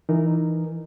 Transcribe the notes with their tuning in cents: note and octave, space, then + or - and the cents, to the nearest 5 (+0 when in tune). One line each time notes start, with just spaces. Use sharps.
E3 +0 D#4 -15 A#4 +0